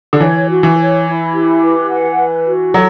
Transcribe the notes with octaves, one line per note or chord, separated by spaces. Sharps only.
D3
E3 C#5
F#4
E3
C#5
E4
G4
B4
F#5
B4
F#4
F#3 A4